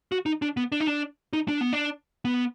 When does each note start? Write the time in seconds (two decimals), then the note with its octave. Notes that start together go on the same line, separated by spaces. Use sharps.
0.12 F#4
0.26 D#4
0.42 D4
0.57 B3
0.72 D4
0.80 D#4
0.87 D4
1.33 D#4
1.48 D4
1.61 B3
1.73 D4
2.25 B3